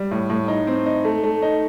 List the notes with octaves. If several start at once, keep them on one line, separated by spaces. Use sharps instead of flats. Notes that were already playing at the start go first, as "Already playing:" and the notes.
Already playing: G3
A2
A2
D#4
C4
D#4
A3
A3
D#4